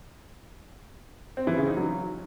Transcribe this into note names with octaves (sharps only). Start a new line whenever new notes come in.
C4
E3
C#3
D#4
F#3